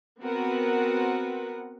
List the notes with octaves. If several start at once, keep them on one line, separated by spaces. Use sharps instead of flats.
B3 C4 F#4 A#4 B4 F#5